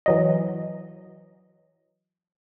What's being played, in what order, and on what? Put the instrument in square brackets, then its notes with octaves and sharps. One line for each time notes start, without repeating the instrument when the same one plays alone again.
[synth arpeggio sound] E3 F#3 D#5